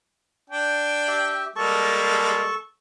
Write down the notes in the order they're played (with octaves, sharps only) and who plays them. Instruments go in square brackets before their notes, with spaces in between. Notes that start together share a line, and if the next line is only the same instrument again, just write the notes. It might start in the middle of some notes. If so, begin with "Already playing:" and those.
[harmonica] D4 G5
[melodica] G4 E5
[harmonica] G3 G#3 A#3 [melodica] A4 A5 C#6